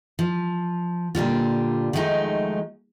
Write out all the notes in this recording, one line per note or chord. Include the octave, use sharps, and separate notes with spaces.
F3
A#2 D3 G3 F4
D#3 F3 F#3 G#3 A3 D#4